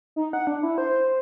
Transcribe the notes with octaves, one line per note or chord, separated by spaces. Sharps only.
D#4
F#5
D4
E4
C5
C5